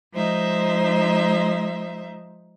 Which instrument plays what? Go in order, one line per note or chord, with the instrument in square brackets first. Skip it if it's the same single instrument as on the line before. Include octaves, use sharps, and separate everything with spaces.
[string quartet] F3 G#3 D#4 C5 E5